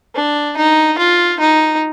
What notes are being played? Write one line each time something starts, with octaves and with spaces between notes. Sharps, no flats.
D4
D#4
F4
D#4